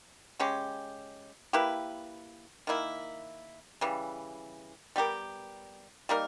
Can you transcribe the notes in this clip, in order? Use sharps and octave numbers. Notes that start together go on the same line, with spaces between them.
C#3 G#3 C#4 G4
A#3 E4 G4 B4
D#3 A#3 E4
C#3 E3 G3
G3 B3 G4 A#4
G3 A#3 D#4 A#4